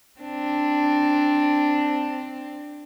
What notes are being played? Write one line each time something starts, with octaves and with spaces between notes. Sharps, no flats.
C4 D4